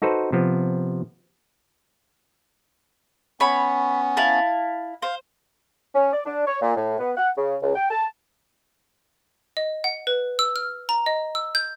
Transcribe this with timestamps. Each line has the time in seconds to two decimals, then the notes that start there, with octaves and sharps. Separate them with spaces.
0.02 D#4 F#4 A4 B4 C5
0.32 C3 F3 B3
3.40 B3 C#4 C#5 B5
4.17 E4 F5 A5
5.02 C5 F5
5.95 C#4
6.13 D5
6.25 D4
6.47 C#5
6.62 A#2
6.76 A2
6.99 B3
7.17 F#5
7.37 C#3
7.62 C#2
7.75 G5
7.91 A5
9.57 D#5
9.84 F#5
10.07 B4
10.39 E6
10.56 F6
10.89 A#5
11.06 D#5
11.35 E6
11.55 G6